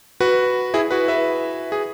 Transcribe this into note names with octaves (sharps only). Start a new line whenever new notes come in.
F#4 B4
E4 G#4
F#4 B4
B4 E5
G#4